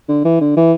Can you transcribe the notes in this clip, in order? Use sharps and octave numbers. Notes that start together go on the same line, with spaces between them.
D3
E3
D3
E3